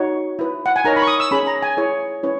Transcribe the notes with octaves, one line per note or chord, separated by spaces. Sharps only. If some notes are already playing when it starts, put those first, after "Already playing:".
Already playing: D#4 F#4 C#5
E4 B4
F#5
G#5
D#4 A#4 C#5 A#5
B5
C#6
D#6
E6
C#4 G#4 C#5 B5
A#5
G#5
E4 G#4 C#5
C#4 E4 B4 C#5